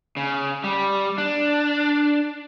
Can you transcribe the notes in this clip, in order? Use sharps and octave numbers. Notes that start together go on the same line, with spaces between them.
C#3
G3
D4